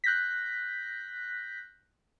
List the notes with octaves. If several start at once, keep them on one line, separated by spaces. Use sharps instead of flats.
F#6 G6 A#6 B6